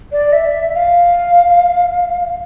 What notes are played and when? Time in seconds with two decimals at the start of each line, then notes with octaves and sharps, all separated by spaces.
0.12 D5
0.33 E5
0.74 F5